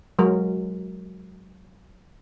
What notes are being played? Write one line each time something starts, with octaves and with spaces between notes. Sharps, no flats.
F#3 G#3 A#4